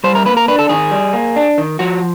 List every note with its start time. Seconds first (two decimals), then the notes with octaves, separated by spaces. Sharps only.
0.04 G3 C5
0.15 A#4
0.25 A#3 B4
0.37 A#4
0.48 D4 B4
0.59 A4
0.69 D#3 G#4
0.91 G3
1.13 A#3
1.36 D4
1.58 D#3
1.79 F3 F#4